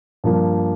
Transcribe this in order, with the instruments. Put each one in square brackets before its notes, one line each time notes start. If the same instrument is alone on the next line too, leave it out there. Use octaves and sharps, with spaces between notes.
[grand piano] G2 F3 A#3